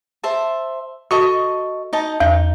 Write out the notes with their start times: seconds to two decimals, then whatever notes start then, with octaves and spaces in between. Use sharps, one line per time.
0.23 C5 E5 A5
1.11 F#4 A4 D#5 C#6
1.93 D#4 D#5 A5
2.20 E2 D#4